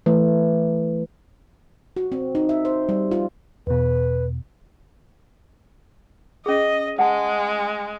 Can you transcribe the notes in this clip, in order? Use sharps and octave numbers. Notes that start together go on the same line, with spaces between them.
E3 A3
F#4
C4
D#4
E5
C5
G3
F4
E2 B2 B4
C#4 G#4 D#5
G#3 F#5 A5